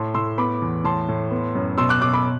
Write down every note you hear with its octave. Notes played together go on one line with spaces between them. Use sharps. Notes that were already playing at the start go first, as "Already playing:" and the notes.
Already playing: A2 A5 C6
A2 C6 E6
B3 B5 D6
E2
A2 A5 C6
A2
B3
F#2
B2 C6 E6
D6 F#6
B2 D6 F#6
B5 D6